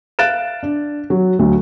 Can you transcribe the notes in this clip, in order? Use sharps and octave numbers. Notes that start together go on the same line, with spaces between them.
E5 F5 F#6 A6 D7 E7
D4
F#3
D2 F#3 A3